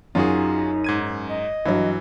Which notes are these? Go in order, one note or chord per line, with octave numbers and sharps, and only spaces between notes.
F#2 D#4 F4 F#4 G#4
G#2 G#6 D#7
D#5
G2 E3 F#3